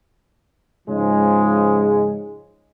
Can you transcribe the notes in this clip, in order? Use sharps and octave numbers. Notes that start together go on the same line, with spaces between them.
G#2 C#3 F3 G#3